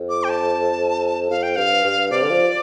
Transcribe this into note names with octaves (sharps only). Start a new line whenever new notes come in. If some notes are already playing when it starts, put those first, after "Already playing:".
Already playing: F2
D6
G5
A5
F2 F5
G5
G2 F5
G2
C3 D5
D3
F3